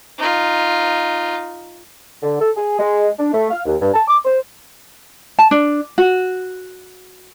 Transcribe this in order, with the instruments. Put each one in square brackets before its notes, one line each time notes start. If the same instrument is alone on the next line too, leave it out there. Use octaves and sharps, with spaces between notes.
[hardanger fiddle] D#4 F4
[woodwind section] D3
A4
G#4
G#3
D4
A3
F5
D#2
G2
A5
D6
C5
[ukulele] A5
D4
F#4